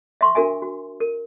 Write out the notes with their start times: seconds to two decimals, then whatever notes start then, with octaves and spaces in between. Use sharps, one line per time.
0.21 E5 C6 C#6
0.35 D4 F#4 A#4 E5 G#5
0.62 F#4
1.00 A#4